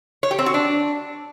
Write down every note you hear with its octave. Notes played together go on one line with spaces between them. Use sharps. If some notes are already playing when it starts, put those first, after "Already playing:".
C#5
G4
C4
F#4
D4